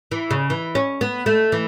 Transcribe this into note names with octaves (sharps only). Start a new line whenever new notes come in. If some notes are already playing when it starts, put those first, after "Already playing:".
E3
C#3
E3
C#4
B3
A3
E3